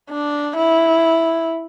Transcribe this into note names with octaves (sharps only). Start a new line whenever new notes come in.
D4
E4